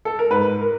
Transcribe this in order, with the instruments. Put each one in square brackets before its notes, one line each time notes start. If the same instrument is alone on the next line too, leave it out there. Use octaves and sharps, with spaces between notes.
[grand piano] A4
A#4
G#2 B4
A#4